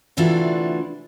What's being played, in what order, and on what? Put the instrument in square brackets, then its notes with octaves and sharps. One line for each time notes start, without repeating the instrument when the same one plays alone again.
[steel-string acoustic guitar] D2 C3 E3 D4 F4 F#4